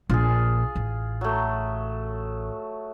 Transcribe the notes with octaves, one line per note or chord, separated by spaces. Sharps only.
A#1 F4 G#4
A1
F#3 A3